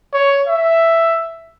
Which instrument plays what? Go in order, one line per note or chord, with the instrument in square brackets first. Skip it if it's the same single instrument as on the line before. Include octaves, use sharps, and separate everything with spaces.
[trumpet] C#5
E5